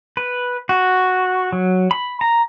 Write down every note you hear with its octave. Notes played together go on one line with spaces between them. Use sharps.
B4
F#4
F#3
B5
A#5